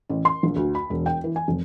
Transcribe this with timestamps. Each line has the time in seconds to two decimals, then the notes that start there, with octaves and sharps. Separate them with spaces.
0.09 A1
0.25 C6
0.43 A#1
0.56 D2
0.75 B5
0.90 E1
1.06 G5
1.24 E3
1.36 G#5
1.48 F1